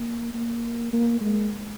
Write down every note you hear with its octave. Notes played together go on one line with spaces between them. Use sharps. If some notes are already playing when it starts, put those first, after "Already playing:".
Already playing: A#3
A#3
A#3
G#3